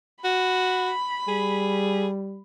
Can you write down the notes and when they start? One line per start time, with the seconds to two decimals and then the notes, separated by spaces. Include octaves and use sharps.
0.24 F#4 B5
1.28 G3 G#4